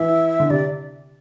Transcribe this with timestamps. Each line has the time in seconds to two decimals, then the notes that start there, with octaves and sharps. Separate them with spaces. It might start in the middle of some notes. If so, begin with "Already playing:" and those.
Already playing: E3 E5
0.40 D3
0.50 C3 D5